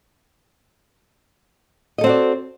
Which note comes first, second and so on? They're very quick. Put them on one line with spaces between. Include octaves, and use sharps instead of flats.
D#5 A4 C4 F#4 D5